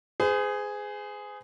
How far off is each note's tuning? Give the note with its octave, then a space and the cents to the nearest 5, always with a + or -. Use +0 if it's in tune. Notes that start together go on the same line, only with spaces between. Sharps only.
G#4 +0 C5 -45